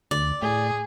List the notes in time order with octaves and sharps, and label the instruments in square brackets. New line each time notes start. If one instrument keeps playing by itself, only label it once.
[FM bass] D2 [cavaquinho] D5
[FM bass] A2 [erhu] G#4